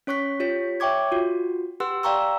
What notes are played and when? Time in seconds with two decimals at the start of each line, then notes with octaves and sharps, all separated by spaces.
0.07 C#4 C#5 C#6 F#6 B6
0.40 F4 G4 C#5 B6
0.80 C#5 E5 G5 C#6 D6 G#6
1.12 F4 F#4
1.80 G4 B4 F#5 C6 E6 F#6
2.03 D5 F5 G5 A#5 C#6 E6